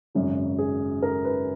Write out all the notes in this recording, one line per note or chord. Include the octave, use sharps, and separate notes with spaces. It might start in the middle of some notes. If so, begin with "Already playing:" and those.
G#1 F#2 C#3 F#3
G#4
A#4
B4